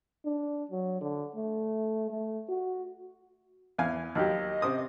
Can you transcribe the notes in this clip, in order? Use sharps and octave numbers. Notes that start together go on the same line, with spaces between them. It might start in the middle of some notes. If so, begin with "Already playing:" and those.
D4
F#3
D3
A3
A3
F#4
E2 F5 G#5
D#2 F#3 G4 D#5
C3 C5 D#6